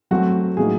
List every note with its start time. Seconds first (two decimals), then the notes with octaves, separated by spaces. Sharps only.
0.11 F#3 A3 C4 F#4
0.57 A2 F#3 A#3 D#4 G#4